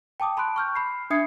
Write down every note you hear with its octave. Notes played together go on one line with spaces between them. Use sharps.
G5 A5 D6 D#6
A5 B5 C6 F#6 D7
C#6 F6 G6
B5 C7
D4 E5 D#6 G#6 C7 C#7